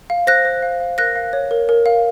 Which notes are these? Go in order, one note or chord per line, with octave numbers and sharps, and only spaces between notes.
F5
C5 F#6 A#6
C5
F5
F5
A#4 F#6 A#6
F5
C#5
A#4
A#4
F5